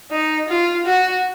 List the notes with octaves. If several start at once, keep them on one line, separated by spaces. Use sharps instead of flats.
D#4
F4
F#4